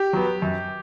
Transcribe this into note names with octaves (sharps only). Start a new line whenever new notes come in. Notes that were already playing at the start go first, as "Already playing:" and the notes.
Already playing: G4
F#3 B3
F#2